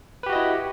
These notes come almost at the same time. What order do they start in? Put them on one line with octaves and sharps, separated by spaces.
B4 G4 F#4 D#5 E4